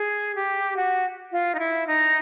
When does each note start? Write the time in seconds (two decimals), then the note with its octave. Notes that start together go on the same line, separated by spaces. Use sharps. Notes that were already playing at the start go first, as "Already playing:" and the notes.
Already playing: G#4
0.35 G4
0.77 F#4
1.32 F4
1.55 D#4
1.59 E4
1.87 D#4